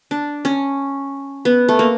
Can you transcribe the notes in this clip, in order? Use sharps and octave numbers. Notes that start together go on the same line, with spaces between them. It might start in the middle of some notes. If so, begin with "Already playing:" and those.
D4
C#4
B3
A3
A#3